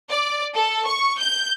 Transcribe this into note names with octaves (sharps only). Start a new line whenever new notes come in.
D5
A4
C#6
G6